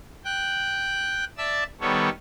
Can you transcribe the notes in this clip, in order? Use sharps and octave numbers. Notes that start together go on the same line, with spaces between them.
G5 F#6
D5 E5 A5 E6
D#3 G3 B3 A4 C#5